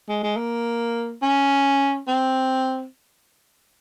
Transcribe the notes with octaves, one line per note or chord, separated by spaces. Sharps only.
G#3
G#3
A#3
C#4
C4